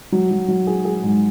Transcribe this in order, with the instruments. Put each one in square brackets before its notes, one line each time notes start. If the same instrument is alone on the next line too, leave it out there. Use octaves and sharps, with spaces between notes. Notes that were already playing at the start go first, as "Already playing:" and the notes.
[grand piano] F#3
F#3
F#3
G#4
G#4
G#2